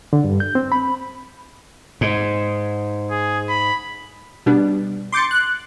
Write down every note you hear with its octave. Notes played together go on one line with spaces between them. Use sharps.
D3
G2
G6
C4
B5
G#2
G#4
B5
B2 G3 B3 D4
C6 D6 G6 A6 C#7
F#6